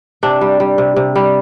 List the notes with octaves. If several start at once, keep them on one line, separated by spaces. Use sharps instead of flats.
C3 D4
G3
G3
C3
C3
G3